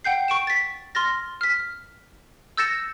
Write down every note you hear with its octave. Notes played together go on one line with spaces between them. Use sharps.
F#5 G5 G6 C7
C#6 D7 E7
A6 B6
C6 F6 A6 A#6
F6 B6
E6 G6 A6 A#6 C#7 E7